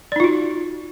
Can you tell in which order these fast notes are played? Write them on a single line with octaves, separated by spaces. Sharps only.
D5 D#4 F4 F#4